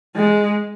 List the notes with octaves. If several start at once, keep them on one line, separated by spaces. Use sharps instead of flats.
G#3